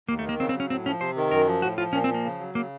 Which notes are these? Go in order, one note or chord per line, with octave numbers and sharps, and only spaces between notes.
D#2 A#3
A3
D#3 A#3
C#3 C4
C4
F#3 C#4
A2 C4
F3 C#4
C3 C5
D#3
F#2 A#4
F3
A2 F#4
F3 F4
A#2 C#4
C4
F3
A#3
C#3
F#3
C#3 A#3